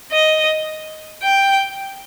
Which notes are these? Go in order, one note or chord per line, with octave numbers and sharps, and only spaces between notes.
D#5
G5